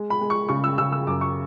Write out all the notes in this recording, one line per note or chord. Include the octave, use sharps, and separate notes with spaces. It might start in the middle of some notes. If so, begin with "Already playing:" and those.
Already playing: G#3
B5
G#3
C#6
C#3 C#6
E6
C#3 E6
E6
F#2 D6
C#6